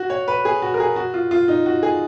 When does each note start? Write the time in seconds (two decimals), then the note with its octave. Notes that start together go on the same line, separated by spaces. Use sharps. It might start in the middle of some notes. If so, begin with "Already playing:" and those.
Already playing: F#4
0.10 C#5
0.28 B4
0.45 G#4
0.62 F#4
0.74 A#4
0.80 G#4
0.96 F#4
1.14 F4
1.31 F4
1.48 D#4
1.66 F#4
1.83 G#4